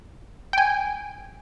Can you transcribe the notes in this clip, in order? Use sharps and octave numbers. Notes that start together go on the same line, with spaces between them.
G5 G#5